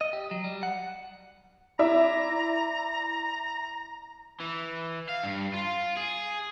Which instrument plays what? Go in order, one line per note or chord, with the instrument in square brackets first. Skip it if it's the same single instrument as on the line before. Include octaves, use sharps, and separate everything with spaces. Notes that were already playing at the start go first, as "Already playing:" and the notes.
[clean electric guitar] D#5
G4
F#3
G3
F#5
[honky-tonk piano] E4 D5 E5 [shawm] A#5
[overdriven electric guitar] E3
F5
G2
F4
G#4